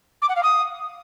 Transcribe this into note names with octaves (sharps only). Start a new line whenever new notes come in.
D6
F#5
F5
D#6